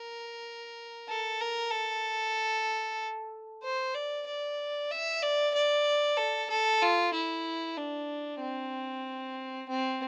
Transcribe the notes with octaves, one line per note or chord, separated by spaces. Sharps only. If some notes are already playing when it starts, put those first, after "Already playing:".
Already playing: A#4
A4
A#4
A4
C5
D5
D5
E5
D5
D5
A4
A4
F4
E4
D4
C4
C4